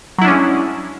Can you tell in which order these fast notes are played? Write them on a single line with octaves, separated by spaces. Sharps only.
F#3 E4 D4 C#4 G#3